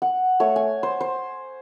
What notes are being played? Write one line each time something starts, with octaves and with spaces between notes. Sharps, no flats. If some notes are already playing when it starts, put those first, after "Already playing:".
F#5
A3 C#5
G#5
C5
C5